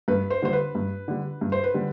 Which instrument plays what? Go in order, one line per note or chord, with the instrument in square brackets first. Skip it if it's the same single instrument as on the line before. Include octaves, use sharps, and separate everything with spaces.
[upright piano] G2 [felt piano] B4
[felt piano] C5
[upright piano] D3 G3 [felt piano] C5
[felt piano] B4
[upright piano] G2
D3 G3
G2
[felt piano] C5
B4
[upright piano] D3 G3